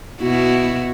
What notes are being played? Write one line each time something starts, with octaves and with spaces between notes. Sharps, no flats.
B2 E4 F#4